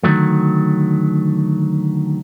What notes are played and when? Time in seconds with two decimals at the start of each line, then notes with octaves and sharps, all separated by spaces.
0.03 D3 D#3 F#3 A3